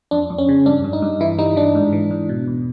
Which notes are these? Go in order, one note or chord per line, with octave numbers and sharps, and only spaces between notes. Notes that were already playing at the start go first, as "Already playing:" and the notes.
F2 D4
F2
C#4
C#3
G2 D4
G2
D#4
G2
E3 E4
G3 D#4
E3 D4
G#2
E3
G#2
B2
E2